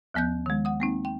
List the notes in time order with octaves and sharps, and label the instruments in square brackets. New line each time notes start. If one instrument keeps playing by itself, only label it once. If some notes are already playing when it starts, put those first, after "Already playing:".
[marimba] D#2 F3 B3 F#6 G6
D#3 G#3
F#5 D#6
A#3 C4 D#4
G5